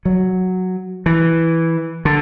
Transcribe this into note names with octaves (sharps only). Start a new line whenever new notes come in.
F#3
E3
D3